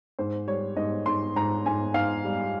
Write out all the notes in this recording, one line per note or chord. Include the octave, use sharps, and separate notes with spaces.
G#2 C5
G3 C#5
G#2 D#5
G#2 C6
G#2 A#5
G#2 G#5
G#2 F5
G3